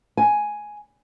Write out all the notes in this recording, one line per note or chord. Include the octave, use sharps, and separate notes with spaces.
G#5